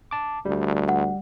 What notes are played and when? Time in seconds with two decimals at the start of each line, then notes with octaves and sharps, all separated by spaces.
0.11 A5 D6
0.45 D2 G3
0.88 F#5